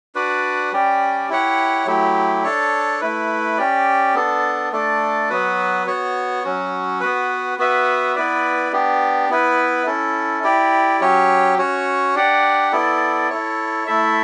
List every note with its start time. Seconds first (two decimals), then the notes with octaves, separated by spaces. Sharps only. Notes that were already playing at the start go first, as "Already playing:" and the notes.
0.15 D4 F#4 B4 D5
0.72 G3 C#4 G4 D5
1.29 E4 G4 C#5 F#5
1.86 F#3 A3 E4 G4
2.44 D4 A4 C#5
3.01 A3 E4 B4
3.58 C#4 G4 D5
4.15 B3 D4 A4
4.72 A3 D4 A4 D5
5.29 F#3 B3 F#4 B4
5.87 B3 F#4 C#5
6.44 F#3 C#4 F#4
7.00 B3 F#4 B4
7.58 B3 F#4 B4 E5
8.15 B3 E4 B4 D5
8.72 B3 D4 G4
9.29 B3 E4 B4
9.86 C#4 E4 A4
10.43 E4 G4 D5
11.01 F#3 C#4 G4 C#5
11.58 C#4 F#4 C#5
12.15 D4 G4 D5 F#5
12.72 B3 E4 A4 D5
13.30 E4 A4 C#5
13.87 A3 E4 A4 E5